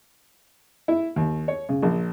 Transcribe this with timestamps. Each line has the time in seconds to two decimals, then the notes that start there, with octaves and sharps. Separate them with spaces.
0.88 E4
1.16 D#2
1.48 C#5
1.69 C#3
1.83 A#1